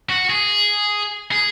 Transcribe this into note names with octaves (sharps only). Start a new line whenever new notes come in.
F#4
G#4
G#4